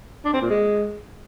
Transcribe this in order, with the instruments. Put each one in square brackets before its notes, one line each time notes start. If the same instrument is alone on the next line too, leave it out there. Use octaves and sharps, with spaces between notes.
[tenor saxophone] D4
C4
A#2
G#3